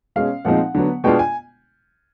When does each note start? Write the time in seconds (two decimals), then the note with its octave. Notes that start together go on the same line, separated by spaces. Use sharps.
0.16 B2 G#3 C#4 F5
0.45 A#2 F3 G#3 C4 D#4 F#5
0.75 D3 F#3 B3
1.04 B2 G#3 B3 D4 F4 G5
1.19 G#5